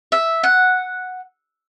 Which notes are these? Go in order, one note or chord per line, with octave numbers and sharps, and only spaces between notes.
E5
F#5